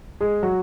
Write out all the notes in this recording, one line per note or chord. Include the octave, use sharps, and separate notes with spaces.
G#3 G#4
F#3 F#4